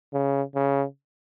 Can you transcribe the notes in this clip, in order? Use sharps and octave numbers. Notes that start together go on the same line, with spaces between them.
C#3
C#3